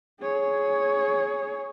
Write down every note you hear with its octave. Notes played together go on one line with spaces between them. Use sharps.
G#4 C#5